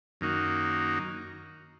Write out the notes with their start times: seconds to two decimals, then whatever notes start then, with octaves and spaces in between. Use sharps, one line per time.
0.21 F#2 D#3 A#3 D#4 F#4